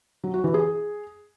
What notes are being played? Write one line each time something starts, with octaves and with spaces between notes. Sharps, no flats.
F#3
F#4
E3
G#4